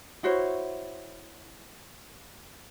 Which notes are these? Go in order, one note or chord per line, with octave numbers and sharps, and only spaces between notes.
E4 F#4 C5 C#5